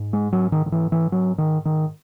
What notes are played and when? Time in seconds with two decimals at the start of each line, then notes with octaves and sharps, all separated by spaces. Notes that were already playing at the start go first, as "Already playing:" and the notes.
Already playing: G#2
0.13 G#3
0.33 F#3
0.52 D#3
0.66 D#3
0.72 E3
0.92 E3
1.12 F#3
1.38 D#3
1.65 D#3